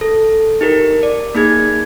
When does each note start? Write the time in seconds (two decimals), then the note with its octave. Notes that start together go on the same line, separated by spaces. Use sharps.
0.01 A4
0.61 D#4 G4 A#4
1.03 D5
1.35 A#3 D#4 G#4 G#6